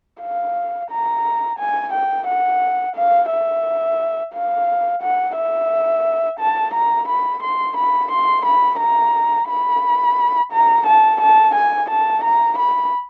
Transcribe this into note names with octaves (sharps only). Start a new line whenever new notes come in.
F5
A#5
G#5
G5
F#5
F5
E5
F5
F#5
E5
A5
A#5
B5
C6
B5
C6
B5
A#5
B5
A#5
A5
A5
G#5
A5
A#5
B5